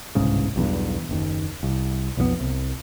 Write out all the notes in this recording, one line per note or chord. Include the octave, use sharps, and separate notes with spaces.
G1 C2 G#2 C#3
B1 E2 G2
F#1 D#2
C2
B1 F2 D3 B3
C2